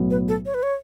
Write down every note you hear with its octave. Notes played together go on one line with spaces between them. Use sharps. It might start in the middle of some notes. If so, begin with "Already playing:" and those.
Already playing: B1 A2 F#3 B3
B4
A4
C#5
B4
C#5